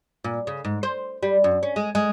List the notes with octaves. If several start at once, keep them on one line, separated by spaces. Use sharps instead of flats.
A#2
C#3
G#2
C5
G3
F#2
C#4
G#3
G#3